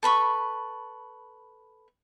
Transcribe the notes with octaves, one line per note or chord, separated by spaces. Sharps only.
A4 B4 B5 C#6